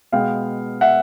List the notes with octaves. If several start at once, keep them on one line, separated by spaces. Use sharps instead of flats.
B2 G#3 B3 F5 G5
E5 F#5